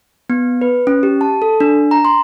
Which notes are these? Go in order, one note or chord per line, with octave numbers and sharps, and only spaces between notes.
B3
B4
C#4
G4
A5
A4
D4
A#5
C6